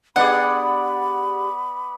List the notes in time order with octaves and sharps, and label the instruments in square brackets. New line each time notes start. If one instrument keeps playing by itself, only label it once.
[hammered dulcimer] B3 D5 [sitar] D4 G4 G#4 [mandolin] F#5 [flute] B5